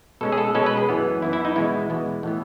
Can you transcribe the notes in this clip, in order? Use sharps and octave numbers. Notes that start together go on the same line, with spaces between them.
B2 G#3 C#4 A4
G#4
A4
B2 G#3 C#4 A4
B4
G#4
F#2 E3 B3
F#2 E3 B3 E4
E4
D#4
E2 B2 G#3 B3 E4
E2 B2 G#3 B3
A2 E3 B3